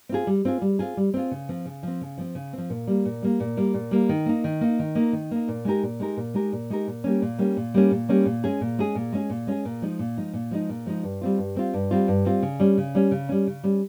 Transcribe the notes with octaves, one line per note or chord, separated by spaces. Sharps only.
C4 F4 G#4
G3
C4 F4 G#4
G3
C4 F4 G#4
G3
C4 F4 G#4
C#3
F3 C4
C#3
F3 C4
C#3
F3 C4
C#3
F3 C4
A#2
G3 A#3
A#2
G3 A#3
A#2
G3 A#3
A#2
G3 A#3
D#3
A#3 D#4
D#3
A#3 D#4
D#3
A#3 D#4
D#3
A#3 D#4
A#2
G#3 D#4 G4 A#4
A#2
G#3 D#4 G4 A#4
A#2
G#3 D#4 G4 A#4
A#2
G#3 D#4 G4 A#4
A#2
G3 A#3 C#4
A#2
G3 A#3 C#4
A#2
G3 A#3 C#4
A#2
G3 A#3 C#4
A#2
G#3 C#4 G#4
A#2
G#3 C#4 G#4
A#2
G#3 C#4 G#4
A#2
G#3 C#4 G#4
A#2
F3 G#3 D#4
A#2
F3 G#3 D#4
A#2
F3 G#3 D#4
A#2
F3 G#3 D#4
G2
G3 C4 F4
G2
G3 C4 F4
G2
G3 C4 F4
G2
G3 C4 F4
C#3
G3 C#4
C#3
G3 C#4
C#3
G3 C#4
C#3
G3 C#4